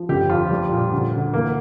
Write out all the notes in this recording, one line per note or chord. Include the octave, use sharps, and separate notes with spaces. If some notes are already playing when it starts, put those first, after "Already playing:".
Already playing: F3
G1 G4
F2 F4
G3
A#2
D2
D2
E3 A#3